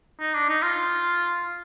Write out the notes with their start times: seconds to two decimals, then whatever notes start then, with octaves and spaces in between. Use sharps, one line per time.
0.20 D#4
0.34 D4
0.49 D#4
0.63 F4